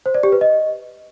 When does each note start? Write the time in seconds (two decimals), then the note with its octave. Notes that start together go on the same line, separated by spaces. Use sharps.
0.06 C5
0.14 D5
0.23 G4
0.32 B4
0.41 D#5